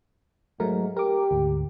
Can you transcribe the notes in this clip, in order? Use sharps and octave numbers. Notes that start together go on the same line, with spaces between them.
G#2 F#3 A3 A#4
G4 A#4 D6
D2 G#2